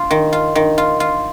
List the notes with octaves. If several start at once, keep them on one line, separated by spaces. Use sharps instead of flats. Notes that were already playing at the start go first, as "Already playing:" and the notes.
Already playing: F4
D#3
F4
D#3
F4
F4